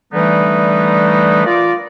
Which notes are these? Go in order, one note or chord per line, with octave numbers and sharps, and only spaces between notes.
D3 E3 G3 A3 B3 D#4
F4 A#4 D5